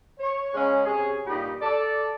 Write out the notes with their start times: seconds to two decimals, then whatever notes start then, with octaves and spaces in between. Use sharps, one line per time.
0.19 C#5
0.53 C#3 G#3 C#4 G#4
0.85 C3 C#4 G#4
1.26 G2 A#2 D#4 G4 B5
1.61 A4 D5